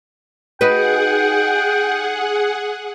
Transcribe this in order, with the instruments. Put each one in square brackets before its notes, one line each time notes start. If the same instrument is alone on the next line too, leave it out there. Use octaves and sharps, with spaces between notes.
[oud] D#4 F#4 B4 [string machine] G#4 F#5 [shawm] G5